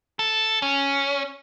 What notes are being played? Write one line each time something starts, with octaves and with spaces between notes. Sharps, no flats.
A4
C#4